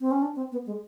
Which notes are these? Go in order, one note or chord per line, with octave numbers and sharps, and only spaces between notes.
C4
C#4
D4
C4
B3
G#3